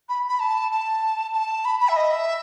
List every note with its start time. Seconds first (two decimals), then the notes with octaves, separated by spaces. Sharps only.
0.09 B5
0.28 B5
0.40 A5
0.71 A5
1.33 A5
1.65 B5
1.80 B5
1.88 E5
1.96 D#5
2.11 E5